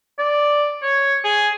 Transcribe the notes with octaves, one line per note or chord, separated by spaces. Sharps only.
D5
C#5
G#4